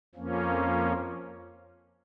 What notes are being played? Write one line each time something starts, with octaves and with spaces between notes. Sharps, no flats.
F2 F3 A#3 C#4